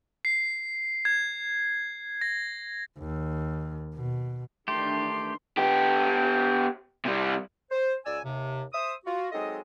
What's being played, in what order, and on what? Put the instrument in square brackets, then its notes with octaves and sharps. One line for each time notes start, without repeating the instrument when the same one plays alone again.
[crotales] C7
G#6
A#6
[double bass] D#2
B2
[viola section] D#3 E3 D4 [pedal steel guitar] A3 G4 [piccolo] C6
[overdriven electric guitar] B3 G4
C3 G3
[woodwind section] C5
C#2 D5 G#5 E6
D#2 C3
C5 E5 D#6
F4 F#4
F#3 G#3 C4 D#4 A4 D#5